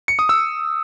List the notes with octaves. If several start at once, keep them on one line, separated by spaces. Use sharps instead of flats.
C#7
D#6
E6